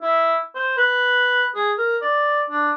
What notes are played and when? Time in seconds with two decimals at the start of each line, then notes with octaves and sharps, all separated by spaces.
0.02 E4
0.55 C5
0.77 B4
1.55 G#4
1.78 A#4
2.01 D5
2.50 D4